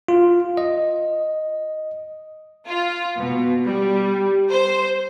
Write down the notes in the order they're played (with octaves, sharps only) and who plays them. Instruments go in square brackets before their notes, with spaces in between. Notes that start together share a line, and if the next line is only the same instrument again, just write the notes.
[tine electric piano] F4
D#5
[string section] F4
B2
G3
C5